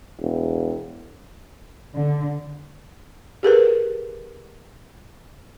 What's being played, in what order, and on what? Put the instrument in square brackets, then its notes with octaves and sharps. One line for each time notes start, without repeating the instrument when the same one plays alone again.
[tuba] E1
[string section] D3
[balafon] G4 G#4 A#4 B4